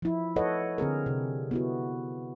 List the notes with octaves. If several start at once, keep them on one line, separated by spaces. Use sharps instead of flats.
F3 E4
A4 B4 C#5 D#5 F#5
D3 C4 G#4 A#4
C3
B3 E4 F#4